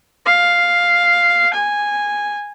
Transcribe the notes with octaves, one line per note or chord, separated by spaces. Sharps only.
F5
G#5